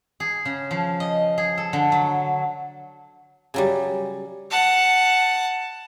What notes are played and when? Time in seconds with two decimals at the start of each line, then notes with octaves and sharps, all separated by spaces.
0.20 G#4
0.45 C#3
0.71 F3
1.00 D#5
1.38 G#4
1.58 A4
1.73 D3
1.92 F#3
3.54 C#3 F#3 G3
4.51 F#5 A5